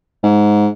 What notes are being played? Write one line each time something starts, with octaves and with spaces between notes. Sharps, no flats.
G#2